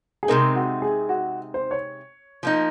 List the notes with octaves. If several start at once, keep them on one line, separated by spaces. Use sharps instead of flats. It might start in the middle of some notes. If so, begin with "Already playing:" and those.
G#4
C3 F3 G#3 C4 D#4 A#4
F#4
G#4
F#4
C5
C#5
F3 A#3 D#4